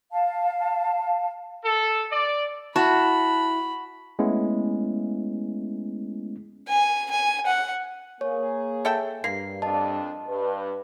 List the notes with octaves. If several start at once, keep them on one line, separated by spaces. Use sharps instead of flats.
F5 A5
A4
D5
E4 F#4 A5 B5
G#3 A3 B3 C#4 E4
G#5
G#5
F#5
A#3 G#4 C#5
A4 E5 G5
G2 A#3 C7
F2 D4 D#5 A5
G2 B4